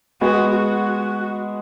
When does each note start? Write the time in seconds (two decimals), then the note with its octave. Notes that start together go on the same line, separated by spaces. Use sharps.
0.21 G#3 B3 F#4
0.54 F#4